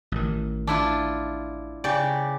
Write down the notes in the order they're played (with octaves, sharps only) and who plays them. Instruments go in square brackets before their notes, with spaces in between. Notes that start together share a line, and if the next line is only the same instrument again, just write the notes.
[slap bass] A1 D#3
[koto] D4 E4 F4
C#3 G4 D5